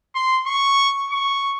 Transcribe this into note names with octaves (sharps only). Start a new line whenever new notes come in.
C6
C#6
C#6